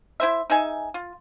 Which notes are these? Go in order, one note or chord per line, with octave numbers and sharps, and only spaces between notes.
E4 C5 E5
D#4 G#4 E5 G#5
F4